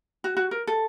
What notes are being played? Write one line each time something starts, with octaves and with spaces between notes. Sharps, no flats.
F#4
F#4
A#4
A4